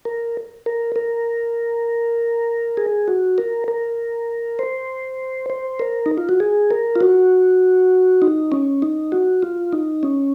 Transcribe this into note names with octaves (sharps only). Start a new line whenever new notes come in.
A#4
A#4
A#4
G#4
F#4
A#4
A#4
C5
C5
A#4
D#4
F4
F#4
G#4
A#4
F4
F#4
D#4
C#4
D#4
F#4
F4
D#4
C#4